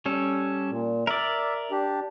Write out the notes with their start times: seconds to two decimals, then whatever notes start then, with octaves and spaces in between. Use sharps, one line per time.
0.06 G3 C#4 A4
0.70 A#2
1.07 A#4 D5 E5
1.72 D4 G4